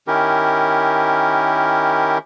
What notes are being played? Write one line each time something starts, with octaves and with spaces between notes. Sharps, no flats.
D#3 C#4 E4 G4 A#4